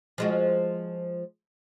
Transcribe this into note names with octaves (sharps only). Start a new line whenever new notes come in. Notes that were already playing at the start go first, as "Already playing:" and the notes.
F3 G#3 F#4